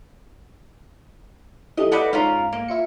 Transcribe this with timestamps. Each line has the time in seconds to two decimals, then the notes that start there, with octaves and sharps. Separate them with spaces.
1.77 E3 G3 A3 D#5
1.92 D#4 F#4 A4 B4 D5 E5
2.13 G#2 C#4 F4 A#4
2.53 A#3
2.68 E4 F4 C#7